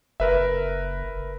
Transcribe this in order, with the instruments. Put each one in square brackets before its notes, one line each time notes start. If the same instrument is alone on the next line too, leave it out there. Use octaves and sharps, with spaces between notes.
[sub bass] F#1 [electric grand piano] A#4 B4 E5